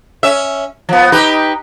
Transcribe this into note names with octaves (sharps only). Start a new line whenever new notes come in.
C#4 E5
F3 B3
D#4 G4 B4